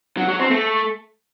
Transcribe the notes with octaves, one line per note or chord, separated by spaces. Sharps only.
F#3
F#3
C4
A3